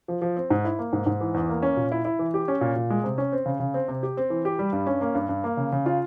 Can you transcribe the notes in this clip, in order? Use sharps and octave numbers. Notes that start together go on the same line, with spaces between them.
F3
F3
C4
G#2
E4
A#3
G#2
G#2
E3
E2
A#3
C#4
A#2
E4
E4
E3
G4
C#4
A#2
A#2
G#3
C3
C#4
C4
C#3
C#3
C4
C3
G4
C4
E3
G4
G3
G2
C#4
A#3
G2
G2
A#3
C#3
C#3
F4